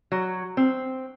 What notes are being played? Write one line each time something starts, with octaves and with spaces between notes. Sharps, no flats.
F#3
C4